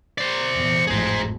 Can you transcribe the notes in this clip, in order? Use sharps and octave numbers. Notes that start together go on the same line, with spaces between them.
C5 D5
E2 A#2
G#1 F2 A2 G#4 C5